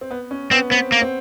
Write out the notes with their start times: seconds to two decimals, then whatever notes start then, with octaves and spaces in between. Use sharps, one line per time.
0.01 C4
0.11 B3
0.31 C#4
0.51 B3 C4
0.71 B3 C4
0.92 A#3
1.02 C4